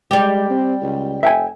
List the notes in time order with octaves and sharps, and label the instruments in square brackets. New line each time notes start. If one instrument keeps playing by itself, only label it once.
[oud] G3 G4 [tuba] G#3
[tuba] C4
C#2
[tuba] F1 [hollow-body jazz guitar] E5 G5 G#5